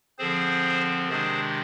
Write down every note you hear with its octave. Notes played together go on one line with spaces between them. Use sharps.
D3 F3 C4 G#4 C5
C3 D#3 G#3 D4 G#4 C5